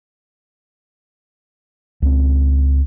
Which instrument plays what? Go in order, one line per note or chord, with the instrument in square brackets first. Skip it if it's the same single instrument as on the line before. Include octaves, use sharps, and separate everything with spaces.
[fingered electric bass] C#2 C4